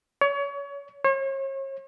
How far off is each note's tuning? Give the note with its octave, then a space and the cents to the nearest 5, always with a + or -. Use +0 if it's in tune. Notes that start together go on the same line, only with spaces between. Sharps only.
C#5 +30
C#5 -40